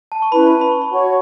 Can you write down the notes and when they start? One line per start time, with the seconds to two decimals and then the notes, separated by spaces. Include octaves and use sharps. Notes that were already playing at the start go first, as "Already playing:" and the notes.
0.12 A5
0.22 C#6
0.32 C#4 E4 B4 B5
0.47 A5
0.61 B5
0.72 C#6
0.82 B5
0.92 F#4 C#5 F#5 C#6